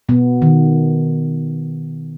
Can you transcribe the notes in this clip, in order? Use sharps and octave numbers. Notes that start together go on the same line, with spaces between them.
B2 B3
D#3